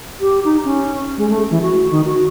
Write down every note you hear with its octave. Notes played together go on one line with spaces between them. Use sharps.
G4
D#4
C#4
G#3
A3
E3
F#4
D#3
F#4